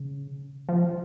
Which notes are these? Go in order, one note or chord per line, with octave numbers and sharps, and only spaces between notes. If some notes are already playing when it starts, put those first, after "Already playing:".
Already playing: C#3
F3